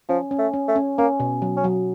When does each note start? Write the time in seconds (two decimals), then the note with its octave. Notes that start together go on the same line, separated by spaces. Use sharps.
0.09 F3 C#4
0.31 C#4
0.38 A3
0.54 C#4
0.68 A3
0.76 C#4
0.98 A#3 C#4
1.20 B2
1.42 F#3
1.57 C#4
1.64 F#3